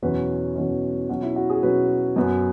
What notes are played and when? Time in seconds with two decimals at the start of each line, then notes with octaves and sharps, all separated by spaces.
0.02 E2 B2 F#3 C#4 B4
0.56 E2 B2 F#3 C#4
1.09 B2 F#3 C#4 F#4
1.23 E4
1.36 F#4
1.50 G#4
1.63 B2 F#3 C#4 B4
2.16 F#2 F#3 B3